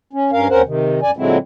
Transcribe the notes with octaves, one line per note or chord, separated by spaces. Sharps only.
C#4
G2 C#4 A#4 F5
D#2 C4 C#4 A#4 C5 F#5
C3 D#3
F#2 D5 G#5
A#2 D3 F#3 G#3 C4 E4